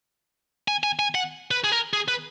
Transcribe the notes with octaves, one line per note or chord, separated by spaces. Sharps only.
G#5
G#5
G#5
F#5
B4
G#4
A#4
G#4
B4